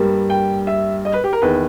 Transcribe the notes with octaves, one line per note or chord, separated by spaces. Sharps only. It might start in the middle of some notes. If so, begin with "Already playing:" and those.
Already playing: G2 G3 A#3
G5
E5
D#5
B4
G4
A#4
E2 D#3 A#3 B4